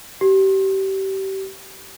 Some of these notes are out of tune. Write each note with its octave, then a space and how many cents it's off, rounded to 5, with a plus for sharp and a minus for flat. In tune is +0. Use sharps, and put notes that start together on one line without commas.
G4 -30